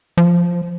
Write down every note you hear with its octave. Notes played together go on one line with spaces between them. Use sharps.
F3